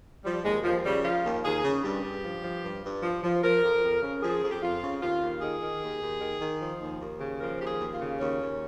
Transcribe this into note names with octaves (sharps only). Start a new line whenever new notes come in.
F3 G3
D#2 G#3
D#2 F3
C#3 G3
F3 F4
D#2
D#2 G#4
C#3
G2 G4
G2
F3
F3
G2
G2
F3
F3
F3 A#4
F2
F2
C#3
F3 G#4
F2
G4
F2 F4
C#3
D#2 F4
D#2
D#3 G#4
D#3
D#2
D#2
D#3
D#3
F3
D#2
D#2
C#3
F3 A#4
D#2 G4
G#4
D#2
F4
C#3
D#2 C#4
D#2